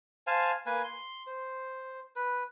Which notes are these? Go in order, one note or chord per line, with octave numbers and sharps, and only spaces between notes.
C5 F5 G#5 A5
A#3 B4 G#5
C6
C5
B4